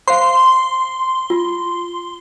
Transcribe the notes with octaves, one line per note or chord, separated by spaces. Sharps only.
C5 F5 C6
F4